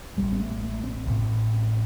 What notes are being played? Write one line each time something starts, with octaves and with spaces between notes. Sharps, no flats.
A1 A2 G3
C4
A3
A3
C4
A1 A2